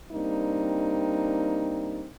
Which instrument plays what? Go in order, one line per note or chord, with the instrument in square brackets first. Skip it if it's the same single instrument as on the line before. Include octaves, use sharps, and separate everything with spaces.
[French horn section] G3 A#3 C4 D4 D#4